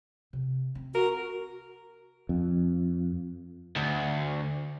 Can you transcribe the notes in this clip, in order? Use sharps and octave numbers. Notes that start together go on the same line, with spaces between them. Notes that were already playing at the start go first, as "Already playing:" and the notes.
C3
C4
F#4 A#4
F2
D2